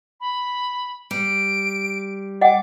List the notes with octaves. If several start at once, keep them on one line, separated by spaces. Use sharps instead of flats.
B5
G3 D7
D#5 F#5 G5 D6